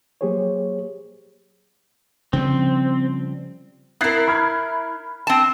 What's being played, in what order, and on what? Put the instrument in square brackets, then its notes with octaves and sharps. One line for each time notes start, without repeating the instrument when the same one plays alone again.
[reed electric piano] F#3 A#3 G4 G#4 C5 C#5
[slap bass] C#3 F3 G3 [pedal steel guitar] C4
[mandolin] E4 A#4 [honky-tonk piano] F#6 A6 C7
[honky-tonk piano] B5 F6 G#6
[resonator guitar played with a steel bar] C4 A5